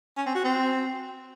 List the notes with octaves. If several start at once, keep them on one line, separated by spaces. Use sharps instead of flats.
C#4
C4
F#4
C4